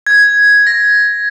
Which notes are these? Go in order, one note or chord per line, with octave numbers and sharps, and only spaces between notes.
G#6
A#6